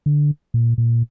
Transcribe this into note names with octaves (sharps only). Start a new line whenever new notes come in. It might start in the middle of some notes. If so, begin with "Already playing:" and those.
D3
A#2
A#2